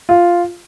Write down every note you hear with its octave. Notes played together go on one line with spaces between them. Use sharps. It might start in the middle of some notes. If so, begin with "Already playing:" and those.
F4